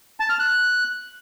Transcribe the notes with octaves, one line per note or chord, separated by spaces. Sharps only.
A5
F6
F#6